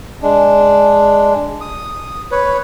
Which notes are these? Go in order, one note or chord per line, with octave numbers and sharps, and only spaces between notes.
G#3 D4
D#6
B4 C#5